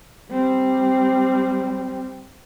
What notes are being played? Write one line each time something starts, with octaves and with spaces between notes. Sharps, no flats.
G3 C4